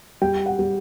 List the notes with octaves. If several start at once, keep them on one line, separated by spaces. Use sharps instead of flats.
G3 G5
F#5
G3